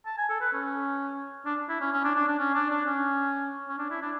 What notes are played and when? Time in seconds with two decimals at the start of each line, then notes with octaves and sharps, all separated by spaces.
0.06 A5
0.18 G#5
0.29 A4
0.41 B4
0.53 C#4
1.46 D4
1.69 E4
1.81 C#4
1.93 C#4
2.04 D4
2.15 D4
2.28 D4
2.39 C#4
2.55 D4
2.70 D4
2.86 C#4
3.68 C#4
3.78 D4
3.90 E4
4.02 D4